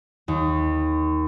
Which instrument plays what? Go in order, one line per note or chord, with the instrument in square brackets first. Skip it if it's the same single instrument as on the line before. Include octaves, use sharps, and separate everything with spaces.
[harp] D#2